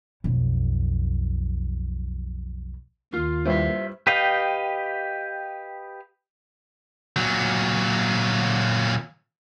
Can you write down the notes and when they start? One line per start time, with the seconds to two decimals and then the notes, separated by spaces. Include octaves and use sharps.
0.24 B1 F2
3.14 D#2 D#3 F4
3.46 G2 E4 F4 C5 E5
4.07 G4 B4 D#5 F5 G5
7.16 A#2 F#3